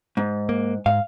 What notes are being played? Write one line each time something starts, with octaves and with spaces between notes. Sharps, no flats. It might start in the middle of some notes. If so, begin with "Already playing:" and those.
G#2
A#3
G#2 F5